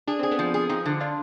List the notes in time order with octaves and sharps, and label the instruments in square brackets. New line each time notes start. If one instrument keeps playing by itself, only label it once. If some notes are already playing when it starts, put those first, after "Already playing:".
[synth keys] D4 [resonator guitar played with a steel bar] G#4
[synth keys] C4 [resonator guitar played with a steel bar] G#4
[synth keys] B3 D4
[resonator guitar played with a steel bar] F3
G#4
[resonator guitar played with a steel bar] F3 [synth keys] C4 D#4
[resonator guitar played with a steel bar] D3
[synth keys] D4 F4